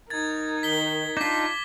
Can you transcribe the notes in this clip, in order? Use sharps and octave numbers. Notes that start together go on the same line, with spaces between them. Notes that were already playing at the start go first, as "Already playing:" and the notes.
D#4 A#4 G#6 A6
D#3 B6 G7
D4 D#4 F4 D6 B6